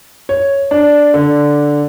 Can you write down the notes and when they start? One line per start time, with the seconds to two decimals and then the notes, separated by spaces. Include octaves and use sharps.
0.29 C#5
0.71 D4
1.14 D3